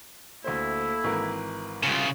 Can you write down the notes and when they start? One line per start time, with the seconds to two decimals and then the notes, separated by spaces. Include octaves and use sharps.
0.44 D2 A3 A#3 E4 C5
1.04 G#1 E3 A#4
1.83 C2 C#3 F4